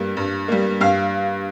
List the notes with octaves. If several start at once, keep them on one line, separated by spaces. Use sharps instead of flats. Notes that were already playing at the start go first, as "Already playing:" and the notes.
Already playing: G2 G3 A#3
G2
G3 A#3
G2 F5